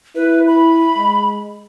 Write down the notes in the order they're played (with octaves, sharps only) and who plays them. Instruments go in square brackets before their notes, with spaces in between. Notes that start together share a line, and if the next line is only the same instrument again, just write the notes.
[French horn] E4 [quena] B4
[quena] B5
[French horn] G#3